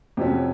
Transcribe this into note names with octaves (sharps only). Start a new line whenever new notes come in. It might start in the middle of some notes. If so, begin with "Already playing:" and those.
F2 C3 F#3 C#4